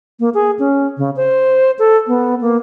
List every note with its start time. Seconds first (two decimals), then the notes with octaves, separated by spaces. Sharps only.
0.20 A#3
0.34 G#4
0.59 C#4
0.98 C#3
1.16 C5
1.79 A4
2.07 B3
2.41 A#3